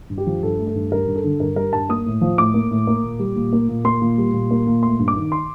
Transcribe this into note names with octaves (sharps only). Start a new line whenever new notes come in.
G2
G4
F3
G2 A4
A3
A4
G2
G3 A#4
G2
A4
D3
G2 A#4
G3 A#4
G2 A5
A#3 D#6
A2
F3
A2 D6
A#3
A2
A#3
A#2
G3
A#2
A#3
A#2
A#3 C6
A#2
G3
A#2
A#3
A#2
A3 C6
G2
D6
D#3
C6